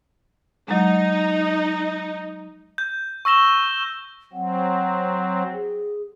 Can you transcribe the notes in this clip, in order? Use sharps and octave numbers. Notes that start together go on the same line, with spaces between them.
F#3 G#3 D#4
G6
C#6 E6 A#6 E7 G7
F#3 C4 F#5
G#4